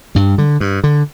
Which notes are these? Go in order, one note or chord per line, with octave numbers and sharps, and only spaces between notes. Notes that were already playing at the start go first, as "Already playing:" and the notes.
G2 G3
D3
G2
D3